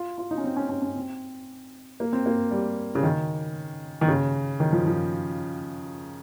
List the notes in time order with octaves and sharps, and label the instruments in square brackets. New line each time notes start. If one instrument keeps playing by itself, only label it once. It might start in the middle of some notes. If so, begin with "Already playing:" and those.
Already playing: [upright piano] F4
F4
D#4
C#4
C4
C#4
C#4
C#4
C4
A#3
C4
A#3
G3
C#3
D#3
D#3
C#3
D#3
F3
F3